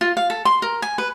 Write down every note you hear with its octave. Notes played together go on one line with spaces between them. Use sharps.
F4
F5
A4
C6
A#4
G#5
B4